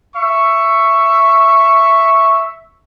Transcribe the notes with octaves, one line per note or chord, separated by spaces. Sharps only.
E5 C#6